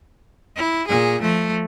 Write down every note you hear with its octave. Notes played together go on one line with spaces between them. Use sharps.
E4
A#2 G#4
F3 A3